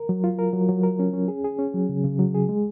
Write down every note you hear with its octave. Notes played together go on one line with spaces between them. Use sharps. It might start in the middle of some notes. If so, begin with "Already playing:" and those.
Already playing: A#4
F#3
F4
A#4
F#3
F#3
A#4
C#4
C#4
G#4
G#4
C#4
F#3
C#3
C#3
F#3
G#4
G#3